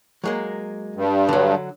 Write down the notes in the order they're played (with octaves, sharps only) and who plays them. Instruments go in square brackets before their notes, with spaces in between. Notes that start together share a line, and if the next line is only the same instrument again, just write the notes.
[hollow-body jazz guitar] F#3 G#3 A#3
[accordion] G2
[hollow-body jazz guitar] D3 F#3